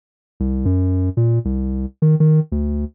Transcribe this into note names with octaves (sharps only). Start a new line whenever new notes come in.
C2
F#2
A#2
C2
D#3
D#3
D2